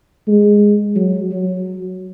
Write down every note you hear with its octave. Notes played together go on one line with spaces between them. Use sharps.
G#3
F#3
F#3